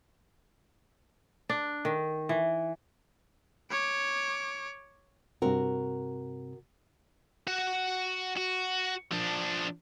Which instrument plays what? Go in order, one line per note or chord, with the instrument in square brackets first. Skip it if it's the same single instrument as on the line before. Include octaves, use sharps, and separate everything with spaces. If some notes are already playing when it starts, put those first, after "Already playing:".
[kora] D4
D#3
E3
[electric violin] C#5 D6
[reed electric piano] G2 C3 C4 [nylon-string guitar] F#4 A#4
[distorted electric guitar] F#4 F#5
F#4
F3 D4